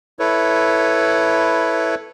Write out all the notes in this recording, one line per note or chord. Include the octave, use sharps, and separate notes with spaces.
E4 A4 B4 C#5